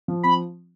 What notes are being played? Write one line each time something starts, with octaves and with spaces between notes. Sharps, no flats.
F3
C4 B5